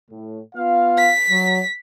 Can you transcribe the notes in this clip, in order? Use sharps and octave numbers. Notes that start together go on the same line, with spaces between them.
A2
B3 F4 F5
B6
F#3